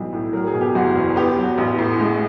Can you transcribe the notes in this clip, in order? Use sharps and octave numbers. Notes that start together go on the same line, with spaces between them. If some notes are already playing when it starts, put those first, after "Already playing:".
Already playing: B1 E3 G3
A2
F#3 A#4
G#4
B2
G4
F#1 F#4
E2
B3 G4
F#3
F#4
A1
A2
G#3